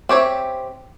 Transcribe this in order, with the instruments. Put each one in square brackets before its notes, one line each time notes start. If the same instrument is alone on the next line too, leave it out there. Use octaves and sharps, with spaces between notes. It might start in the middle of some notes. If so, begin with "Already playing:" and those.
[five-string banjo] C4 G4 C#5 E5